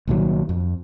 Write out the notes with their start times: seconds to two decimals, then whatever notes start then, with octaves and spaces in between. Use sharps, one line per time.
0.08 C2 A#2 D#3 F#3
0.49 F2